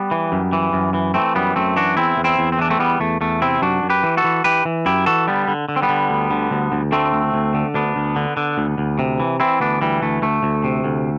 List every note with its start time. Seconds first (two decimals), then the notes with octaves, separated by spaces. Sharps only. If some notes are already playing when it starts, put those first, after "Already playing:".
Already playing: G3 B3
0.11 E3
0.32 F#2
0.53 E3
0.73 F#2
0.94 E3
1.14 E3 A3 C4
1.35 F#2 G3 B3
1.56 F#2 A3 C4
1.76 E3 D4 F#4
1.97 E2 C4 E4
2.17 E2
2.24 C4 E4
2.39 E2
2.52 C4
2.59 E3 D4
2.70 A3 C4
2.79 E2 G3 B3
3.00 E2 A3
3.21 E2 A3
3.42 C3 C4 E4
3.62 F#2 D4 F#4
3.83 F#2
3.90 G4 B4
4.03 E3
4.17 F#4 A4
4.24 E3
4.44 E3 G4 B4
4.65 E3
4.86 F#2 E4 G4
5.06 E3 F#4 A4
5.27 D3 G3 B3
5.48 D3
5.69 D3
5.76 C4
5.82 G3 B3
5.89 D3
6.10 D2
6.31 D3
6.51 D2
6.72 D2
6.92 D3 A3 C4
7.13 D2
7.34 D2
7.54 D3
7.74 D2 B3 D4
7.96 D2
8.16 D3
8.37 D3
8.58 D2
8.78 D2
8.99 C3
9.20 E3
9.40 E3 C4 E4
9.60 D2 B3 D4
9.81 E3 G3
10.02 D2 A3
10.22 D2 A3
10.43 D2
10.64 C3
10.85 D2